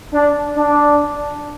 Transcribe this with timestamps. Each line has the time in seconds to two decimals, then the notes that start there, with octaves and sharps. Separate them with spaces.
0.13 D4
0.56 D4